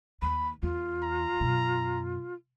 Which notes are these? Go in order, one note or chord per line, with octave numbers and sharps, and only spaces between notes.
D#2 B5
E2 F4
A#5
F#2 B2